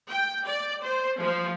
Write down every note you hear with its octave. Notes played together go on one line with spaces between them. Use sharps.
G5
D5
C5
F3